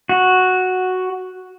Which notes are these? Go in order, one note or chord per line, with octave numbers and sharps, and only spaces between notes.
F#4